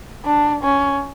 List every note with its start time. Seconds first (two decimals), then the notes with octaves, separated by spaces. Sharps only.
0.25 D4
0.63 C#4